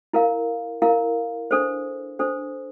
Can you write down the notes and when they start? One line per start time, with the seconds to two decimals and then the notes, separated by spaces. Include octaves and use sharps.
0.13 E4 A#4 F5
0.82 E4 A#4 F5
1.51 D4 A4 C5
2.19 D4 A4 C5